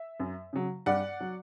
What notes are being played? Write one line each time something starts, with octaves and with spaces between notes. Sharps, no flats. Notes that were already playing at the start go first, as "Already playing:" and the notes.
Already playing: E5
F#2
C#3 F#3
G2 D5 F#5
F#3